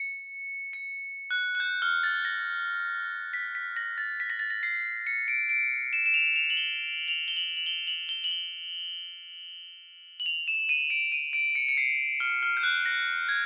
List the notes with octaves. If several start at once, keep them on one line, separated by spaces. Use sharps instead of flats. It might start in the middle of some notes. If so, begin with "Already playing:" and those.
Already playing: C#7
C#7
F#6
F#6
G6
F6
A6
A#6
B6
B6
A#6
A6
B6
A#6
A6
A#6
C7
C#7
D7
D7
E7
E7
F7
F7
F#7
G7
F7
G7
F#7
F#7
G7
F#7
G7
F#7
G7
F#7
F7
E7
D#7
D7
D#7
D7
C#7
C#7
C7
F6
F6
G6
F#6
A#6
G#6